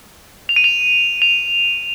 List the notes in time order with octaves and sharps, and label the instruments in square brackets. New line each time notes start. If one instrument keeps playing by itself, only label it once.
[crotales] F7
D#7
F7
F7